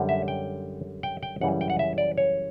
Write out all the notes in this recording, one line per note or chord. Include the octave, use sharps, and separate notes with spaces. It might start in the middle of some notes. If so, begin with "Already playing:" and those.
Already playing: F#2 D3 G3
E5
G5
G5
G5
F#2 C#3 E3 G3 F#5
G5
F#5
E5
D5
C#5